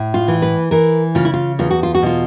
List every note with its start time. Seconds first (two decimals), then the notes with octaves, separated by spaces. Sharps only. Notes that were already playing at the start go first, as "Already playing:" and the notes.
Already playing: A2
0.14 F4
0.28 E3
0.42 B4
0.71 E3 A#4
1.15 C#3 F4
1.25 E4
1.34 F4
1.59 E2 F4
1.70 F#4
1.83 F4
1.95 F#4
2.03 B2 F4